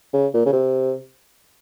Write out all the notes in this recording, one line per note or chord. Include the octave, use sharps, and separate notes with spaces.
C#3
A#2
C#3
C3